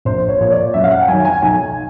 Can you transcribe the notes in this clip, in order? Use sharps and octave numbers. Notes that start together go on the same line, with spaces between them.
A#1 C5
C#5
A#2 F3 C#5
D5
F#2 E5
F5
F#5
G5
D#3 F#3 G#5
G#5
B1 G#5